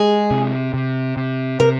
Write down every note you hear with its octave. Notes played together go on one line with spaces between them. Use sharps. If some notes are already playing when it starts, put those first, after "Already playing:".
Already playing: G#3 G#4
C3
C3
C3
C3 A#4